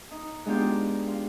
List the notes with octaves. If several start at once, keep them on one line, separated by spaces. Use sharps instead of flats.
D#4
G#3 B3 D4 D#4 F4 G4
F4